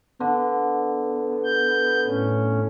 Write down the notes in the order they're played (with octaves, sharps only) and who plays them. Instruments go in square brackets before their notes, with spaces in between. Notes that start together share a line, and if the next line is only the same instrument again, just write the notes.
[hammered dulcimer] D3 [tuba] B3
[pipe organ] G6
A2 C#4